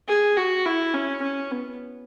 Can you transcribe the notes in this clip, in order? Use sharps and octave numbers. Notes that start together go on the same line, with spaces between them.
G#4
F#4
E4
C#4
C#4
B3